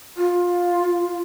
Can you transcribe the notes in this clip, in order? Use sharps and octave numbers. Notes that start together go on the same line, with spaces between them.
F4